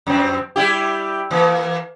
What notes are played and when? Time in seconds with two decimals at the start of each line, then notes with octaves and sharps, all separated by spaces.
0.07 F2 C4
0.56 G3 E4 G4
1.31 E3 A#3